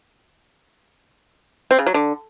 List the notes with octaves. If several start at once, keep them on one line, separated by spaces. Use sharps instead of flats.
C4
C#3
F#3
D3